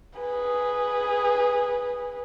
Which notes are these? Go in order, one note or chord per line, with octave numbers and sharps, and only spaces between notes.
G#4 B4